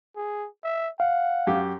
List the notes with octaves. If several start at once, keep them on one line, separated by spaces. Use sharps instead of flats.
G#4
E5
F5 F#5
F#2 G4